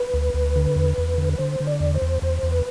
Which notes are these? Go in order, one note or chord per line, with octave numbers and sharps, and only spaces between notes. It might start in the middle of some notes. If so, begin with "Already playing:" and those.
Already playing: B4
D2
D2
D3
E2
E2
D3
B4
D3 C5
D3
D5
E2
C5
E2
E2 C5
E2
B4